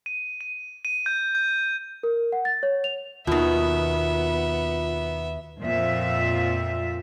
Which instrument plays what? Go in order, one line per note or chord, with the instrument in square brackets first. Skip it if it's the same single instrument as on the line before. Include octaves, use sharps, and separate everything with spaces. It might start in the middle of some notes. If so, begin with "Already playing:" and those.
[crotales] D#7
D#7
D#7
G6
G6
[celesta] A#4
F#5
A6
C#5
F7
[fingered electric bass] D#2 [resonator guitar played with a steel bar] B2 D#3 [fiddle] B3 E5 [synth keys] F4
[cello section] F2 A#2 F3 C4 F4 E5